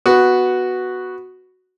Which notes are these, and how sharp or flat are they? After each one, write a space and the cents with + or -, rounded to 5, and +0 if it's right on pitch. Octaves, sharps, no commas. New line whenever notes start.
B3 +0 F#4 +0